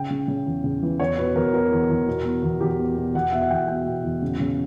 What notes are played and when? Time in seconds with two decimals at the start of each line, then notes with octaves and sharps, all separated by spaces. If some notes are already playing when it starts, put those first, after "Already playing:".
Already playing: C#3 G5
0.10 C#3
0.28 C#3
0.46 E2
0.64 C#3
0.83 E3
1.00 E2 C#5
1.18 B2 B4
1.36 E2 A#4
1.53 B2 A#4
1.72 E2
1.90 E2
2.07 B2
2.25 B2
2.43 E2
2.61 E2 G4
2.79 B2
2.97 B2
3.15 E2 F#5
3.32 B2 E5
3.42 F#5
3.51 E2 G5
3.68 B2 G5
3.86 B2
4.04 E2
4.22 C#3
4.40 C#3